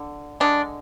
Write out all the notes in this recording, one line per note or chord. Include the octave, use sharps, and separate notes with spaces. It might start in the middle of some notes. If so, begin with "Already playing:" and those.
Already playing: D3
D3 G#3 D4